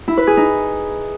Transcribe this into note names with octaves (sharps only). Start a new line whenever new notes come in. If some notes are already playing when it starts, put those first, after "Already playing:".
E4
B4
G#4
D#4